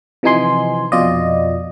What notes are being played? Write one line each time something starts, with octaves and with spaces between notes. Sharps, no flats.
C3 E3 F3 D#4 G#5 C6
F2 B2 F4 D5 D#5